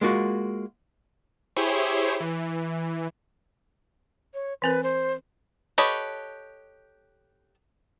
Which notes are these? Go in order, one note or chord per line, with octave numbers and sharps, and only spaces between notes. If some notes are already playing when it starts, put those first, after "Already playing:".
G#3 A#3 F4 F#4
E4 G4 G#4 C5 C#5
E3
C#5
E3 C4 A#4 B4
C5
G4 A4 B4 C#5 D#5